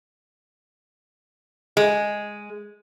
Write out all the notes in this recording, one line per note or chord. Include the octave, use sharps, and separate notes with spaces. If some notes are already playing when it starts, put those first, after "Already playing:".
G#3